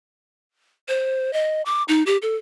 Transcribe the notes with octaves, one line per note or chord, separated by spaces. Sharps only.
C5
D#5
D6
D#4
G4
A4